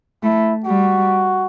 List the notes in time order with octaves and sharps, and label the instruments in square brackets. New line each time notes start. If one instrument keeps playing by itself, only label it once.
[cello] A3 [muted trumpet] E4
[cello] G3 [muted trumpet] F#4